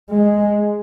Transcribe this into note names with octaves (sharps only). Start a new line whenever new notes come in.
G#3